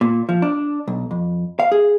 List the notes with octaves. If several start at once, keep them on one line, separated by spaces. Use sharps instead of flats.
A#2
F3
D4
B1
F2
F5
G#4